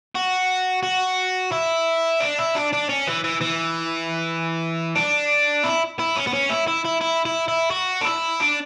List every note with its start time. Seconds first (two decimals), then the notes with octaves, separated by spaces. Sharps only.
0.15 F#4
0.83 F#4
1.51 E4
2.20 D4
2.38 E4
2.55 D4
2.73 D4
2.89 C#4
3.07 E3
3.24 E3
3.41 E3
4.96 D4
5.64 E4
5.99 E4
6.16 C#4
6.27 B3
6.33 C#4
6.50 E4
6.68 E4
6.85 E4
7.01 E4
7.25 E4
7.48 E4
7.71 F#4
8.01 D4
8.05 E4
8.40 D4